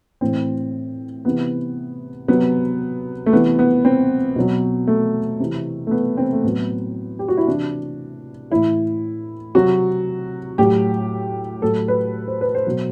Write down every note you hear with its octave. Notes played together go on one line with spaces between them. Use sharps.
A2 E3 C4
C3 E3 B3
C3 F#3 B3
A3
C3 E3 B3
B3
C4
B2 F#3
A3
C3 E3
A3
B3
C4
A3
A2 F#3 B3
G4
F#4
E4
C3 E3 D4
A2 E3 E4
C3 F#3 F#4
A2 F#3 G4
A2 F#3 A4
B4
C5
B4
C5
B2 F#3